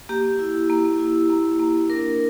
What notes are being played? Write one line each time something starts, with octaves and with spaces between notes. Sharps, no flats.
A#3 G4
E4
A#3
E4
A#3
A#3
D4 A#4